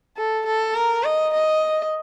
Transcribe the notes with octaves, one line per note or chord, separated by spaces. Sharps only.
A4
A4
A#4
D#5
D#5